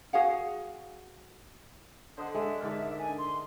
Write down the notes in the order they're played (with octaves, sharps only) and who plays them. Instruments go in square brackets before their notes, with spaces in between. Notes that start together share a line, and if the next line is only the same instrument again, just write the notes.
[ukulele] F#4 G#4 F5 F#5
[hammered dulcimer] D3 D#5 F#5 [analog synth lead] C5
[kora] G#3 [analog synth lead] D4 [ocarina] E5
[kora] G#2 D3 A4 [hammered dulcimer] A#4
[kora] D5 [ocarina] G#5
[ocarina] C6